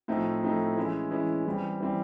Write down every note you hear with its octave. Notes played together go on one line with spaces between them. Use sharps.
A2 F3 A3 C4 D#4
A2 F3 A3 C4 D#4
E3 G#3 C#4 E4
E3 G#3 C#4 E4
E3 G3 C4
E3 G3 C4